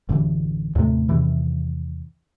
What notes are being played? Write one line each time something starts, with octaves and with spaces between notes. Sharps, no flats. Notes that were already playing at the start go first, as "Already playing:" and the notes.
A1 F#2 D3 E3
D#2 A2 C3 A3
E2 C3 D#3 E3